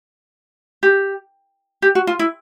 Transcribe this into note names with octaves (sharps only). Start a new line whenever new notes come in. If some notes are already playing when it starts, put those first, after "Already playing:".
G4
G4
F#4
F4
E4